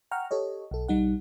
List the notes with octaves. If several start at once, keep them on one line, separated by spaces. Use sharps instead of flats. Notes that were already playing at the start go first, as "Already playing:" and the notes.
F#5 G5 A#5 C#6 F6
G4 A4 C#5 D#5
B1 A4
B1 G3 D#4 F#5